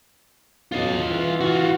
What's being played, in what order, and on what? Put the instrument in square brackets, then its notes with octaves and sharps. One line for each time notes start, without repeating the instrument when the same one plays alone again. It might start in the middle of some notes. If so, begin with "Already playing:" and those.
[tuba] B1 [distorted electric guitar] F4 D#5
[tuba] E3
[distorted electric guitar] F4 F#4